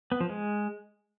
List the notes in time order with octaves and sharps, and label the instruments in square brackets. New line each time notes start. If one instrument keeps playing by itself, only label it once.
[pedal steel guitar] B3
F3
G#3